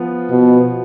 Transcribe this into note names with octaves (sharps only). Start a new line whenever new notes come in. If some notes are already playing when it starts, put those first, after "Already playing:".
Already playing: F3 B3 F4
B2